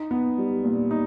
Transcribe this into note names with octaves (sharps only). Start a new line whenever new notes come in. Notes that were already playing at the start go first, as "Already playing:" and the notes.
Already playing: D#4
B3
G3
A#2
D#4